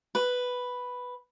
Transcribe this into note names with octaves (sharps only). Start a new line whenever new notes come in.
B4